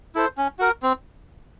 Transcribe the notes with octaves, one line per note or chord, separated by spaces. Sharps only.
E4 A4 C5
C#4
F#4 A#4
C4